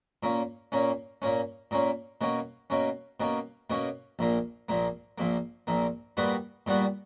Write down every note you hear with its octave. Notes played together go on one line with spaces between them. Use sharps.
A#2 A#3 C#4
A#2 A#3 C#4
A#2 A#3 C#4
A#2 A#3 C#4
B2 A#3 C#4
B2 A#3 C#4
B2 A#3 C#4
B2 A#3 C#4
A#1 A#2 A#3
A#1 A#2 A#3
A#1 A#2 A#3
A#1 A#2 A#3
A#2 G3 B3 F#4
A#2 G3 B3 F#4